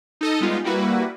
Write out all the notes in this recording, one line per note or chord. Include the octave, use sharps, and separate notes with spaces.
D#4 A4 D#5
G3 G#3 B3 D#4 F4
G3 A#3 E4 F#4 B4